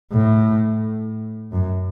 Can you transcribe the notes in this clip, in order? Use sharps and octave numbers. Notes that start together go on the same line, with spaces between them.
A2
F#2